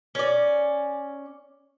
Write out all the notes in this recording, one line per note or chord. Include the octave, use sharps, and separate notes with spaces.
C#4 D5